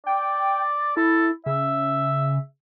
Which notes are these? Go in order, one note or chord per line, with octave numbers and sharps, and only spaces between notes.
D5 G5
E4 A4
C#3 E5